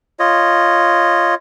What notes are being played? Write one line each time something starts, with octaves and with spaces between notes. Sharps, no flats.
F4 C#5 D#5